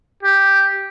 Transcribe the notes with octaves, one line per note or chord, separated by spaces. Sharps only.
G4